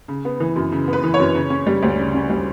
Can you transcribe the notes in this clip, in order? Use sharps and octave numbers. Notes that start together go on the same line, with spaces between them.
C#3
B3
E3
F#2
C#3
B3
B4
E3
C#5
F#2
C#3
C#4
G3
D2
C#3
C#4
G3